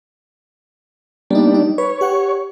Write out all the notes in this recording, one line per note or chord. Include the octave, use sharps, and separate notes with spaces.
G3 A#3 B3 D4 D#4
D#4
B4 C#5
G4 F#5 C#6